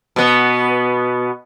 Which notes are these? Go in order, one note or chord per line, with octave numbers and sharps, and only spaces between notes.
B2 B3